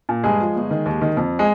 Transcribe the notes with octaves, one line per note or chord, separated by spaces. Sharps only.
A#2
G2 G#3 G#4
F3
G1
D#3
D#2
D#3
F2
G#3